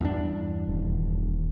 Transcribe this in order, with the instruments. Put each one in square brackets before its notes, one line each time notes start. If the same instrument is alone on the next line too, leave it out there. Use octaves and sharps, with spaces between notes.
[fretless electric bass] E2 G2 D4
[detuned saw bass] D#1